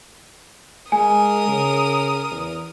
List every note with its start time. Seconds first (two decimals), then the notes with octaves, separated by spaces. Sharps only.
0.92 G#3 A#4 G#5 D#6
1.48 C#3
2.31 E2